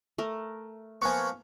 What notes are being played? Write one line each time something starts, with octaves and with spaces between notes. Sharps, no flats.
A3 A#4
F3 A#3 B3 G#5 C#6